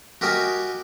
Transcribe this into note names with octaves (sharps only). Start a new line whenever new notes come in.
F#4 G4 A#4 D#5 G#5